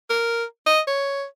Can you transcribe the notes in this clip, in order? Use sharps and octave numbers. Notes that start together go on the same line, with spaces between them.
A#4
D#5
C#5